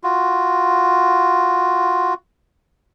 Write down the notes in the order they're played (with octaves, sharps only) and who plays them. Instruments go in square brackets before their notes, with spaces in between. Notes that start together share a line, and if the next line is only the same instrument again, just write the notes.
[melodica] F4 F#4